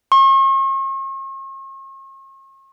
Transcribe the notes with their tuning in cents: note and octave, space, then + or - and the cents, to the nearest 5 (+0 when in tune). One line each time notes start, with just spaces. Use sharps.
C#6 -45